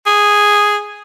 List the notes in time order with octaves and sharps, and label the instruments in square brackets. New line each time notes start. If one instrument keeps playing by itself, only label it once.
[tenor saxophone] G#4